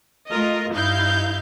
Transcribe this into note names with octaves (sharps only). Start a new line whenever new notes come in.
A3 F4 A#4 D#5
G2 D#4 E4 F5 G6